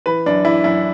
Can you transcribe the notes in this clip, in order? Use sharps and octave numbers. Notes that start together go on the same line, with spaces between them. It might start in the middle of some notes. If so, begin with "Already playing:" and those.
E3 B4
F#2 D4
E3 E4
F#2 E4